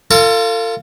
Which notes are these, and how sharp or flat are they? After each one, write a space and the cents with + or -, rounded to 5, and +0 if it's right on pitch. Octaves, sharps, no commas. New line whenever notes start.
F4 -10 A4 +40